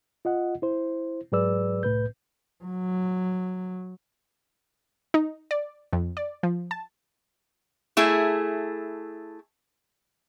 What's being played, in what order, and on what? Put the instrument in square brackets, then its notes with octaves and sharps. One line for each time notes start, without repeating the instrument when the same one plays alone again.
[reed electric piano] F4 D#5 F#5
E4 C5
G#2 F#3 G#4 B4 D5 E6
C2 A2 B4 G6
[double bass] F#3
[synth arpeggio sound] D#4
D5
F2
D5
F3
A5
[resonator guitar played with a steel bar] A3 E4 G#4